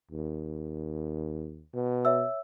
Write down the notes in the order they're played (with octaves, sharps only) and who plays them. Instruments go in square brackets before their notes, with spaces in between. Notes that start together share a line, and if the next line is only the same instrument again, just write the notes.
[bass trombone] D#2
B2
[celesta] C#5 E5 E6